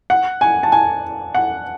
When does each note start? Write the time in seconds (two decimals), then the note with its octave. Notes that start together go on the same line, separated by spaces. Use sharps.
0.10 F#5
0.41 G#5
0.63 A5
0.72 G#5
1.35 F#5